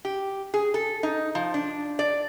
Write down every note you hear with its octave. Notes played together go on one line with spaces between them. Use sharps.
G4
G#4
A4
D#4
F3
D4
D5